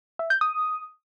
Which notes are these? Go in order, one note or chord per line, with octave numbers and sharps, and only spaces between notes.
E5
G6
D#6